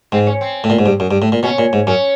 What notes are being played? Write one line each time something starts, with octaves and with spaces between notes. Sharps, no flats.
G#2 C4
C#4
C4
A2
A#2
G#2
G2
F#2
G2
A2
A#2
B2 C#4
A#2
G#2
F#2 C#4